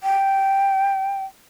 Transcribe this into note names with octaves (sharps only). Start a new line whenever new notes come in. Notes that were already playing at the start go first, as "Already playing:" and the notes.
G5